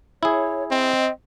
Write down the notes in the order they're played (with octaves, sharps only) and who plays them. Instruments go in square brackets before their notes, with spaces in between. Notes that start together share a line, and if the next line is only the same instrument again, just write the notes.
[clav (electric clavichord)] E4 G#4 [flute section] C#5
[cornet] C4 [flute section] D#5 G5